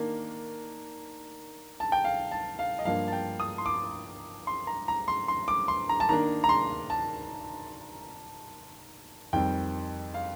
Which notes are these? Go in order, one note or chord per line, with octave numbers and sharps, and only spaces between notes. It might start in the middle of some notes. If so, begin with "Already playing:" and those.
Already playing: D#3 A#3 D4
A5
G5
F5
A5
F5
D#5
G2 F3 A#3 D4 F5
A5
G5
D#6
C6
D6
C6
A#5
A#5
C6
C6
D6
C6
A#5
A5
D#3 A#3 D4 A#5
A#5
C6
A5
F2 D#3 G3 C4 G5
F5